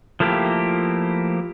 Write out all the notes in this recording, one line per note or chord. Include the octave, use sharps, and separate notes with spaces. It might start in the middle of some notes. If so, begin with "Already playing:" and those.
F3 A3 A#3 E4 G4